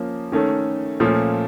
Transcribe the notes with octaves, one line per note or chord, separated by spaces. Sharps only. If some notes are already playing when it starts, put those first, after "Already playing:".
Already playing: F3 A#3 C#4
D#3 A3 C#4 A4
A#2 F3 A3 C#4